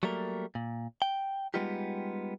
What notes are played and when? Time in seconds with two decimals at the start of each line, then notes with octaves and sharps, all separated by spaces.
0.03 F#3 G3 A3 A#3 A#4
0.55 A#2
1.02 G5
1.54 G3 G#3 B3 D#4 F4 G4